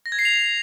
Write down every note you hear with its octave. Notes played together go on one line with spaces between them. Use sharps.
A#6
G#6
C7
F7